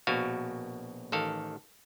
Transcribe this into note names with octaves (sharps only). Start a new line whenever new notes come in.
A#1 B2 F#4 F5
A1 D#3 A4 F5